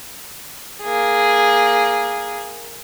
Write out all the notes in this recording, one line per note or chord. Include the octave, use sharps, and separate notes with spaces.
A#3 G#4